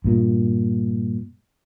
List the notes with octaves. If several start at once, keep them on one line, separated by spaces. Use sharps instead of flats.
G2 A#2